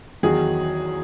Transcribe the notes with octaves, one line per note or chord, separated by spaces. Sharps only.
E2 D#3 F#3 G#4